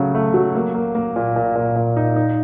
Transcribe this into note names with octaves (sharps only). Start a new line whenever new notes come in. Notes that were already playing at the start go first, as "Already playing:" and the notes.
Already playing: C#3 F#3 A3
A3
F#3
A#3
A#3
A#3
A#2
A#2
A#2
A#2
D#4
D#4